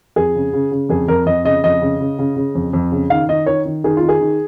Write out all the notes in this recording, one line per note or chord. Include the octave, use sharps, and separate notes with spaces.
F2 G#4
C#3
C#3
C#3
F2 G#4
F2 A#4
F2 D#5
C#3 D#5
F2 D#5
C#3
C#3
C#3
C#3
F2
F2
C#3
D#3 F5
D#3 D#5
D#3 C#5
D#3
D#3 G#4
F4
D#3
G#4
D#3